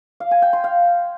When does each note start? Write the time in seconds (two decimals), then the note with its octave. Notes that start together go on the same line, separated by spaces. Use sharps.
0.20 F5
0.31 G#5
0.42 G5
0.53 C6
0.64 F5